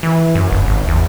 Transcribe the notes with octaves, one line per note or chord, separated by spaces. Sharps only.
E3
F#2
G1
G#1
E2